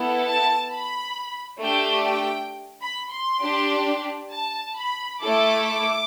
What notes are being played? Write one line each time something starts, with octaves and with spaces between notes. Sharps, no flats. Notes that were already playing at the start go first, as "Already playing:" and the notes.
Already playing: B3 E4 A4
A5
B5
A3 D4 G4 G5
G5
B5
C6
D4 G4
A5
B5
A3 E4 A4 D6